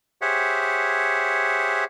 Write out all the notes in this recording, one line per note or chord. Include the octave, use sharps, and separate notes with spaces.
G4 G#4 C5 C#5 E5 F#5